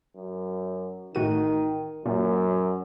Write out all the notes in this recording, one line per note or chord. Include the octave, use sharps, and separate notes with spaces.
F#2
A1 D#3 F#4 D#7
F#2 A#2